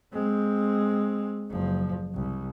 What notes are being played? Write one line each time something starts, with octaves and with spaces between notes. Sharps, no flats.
G#3 C4
F#1 F3
C2